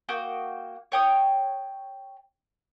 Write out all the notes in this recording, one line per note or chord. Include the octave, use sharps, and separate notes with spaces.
A#3 F#4 G5 D#6
C#5 G5 D#6